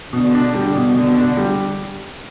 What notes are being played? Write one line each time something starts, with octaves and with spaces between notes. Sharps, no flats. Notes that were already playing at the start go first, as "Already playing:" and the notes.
B2 D3
D4
G3
B2
B2 D3
D4
G3